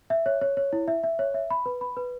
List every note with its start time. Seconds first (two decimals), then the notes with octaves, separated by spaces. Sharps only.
0.10 E5
0.26 C#5
0.41 C#5
0.57 C#5
0.73 E4
0.88 E5
1.04 E5
1.19 C#5
1.34 E5
1.50 B5
1.66 B4
1.81 B5
1.97 B4